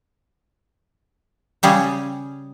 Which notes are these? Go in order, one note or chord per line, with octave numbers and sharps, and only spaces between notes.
C#3 G3 G#4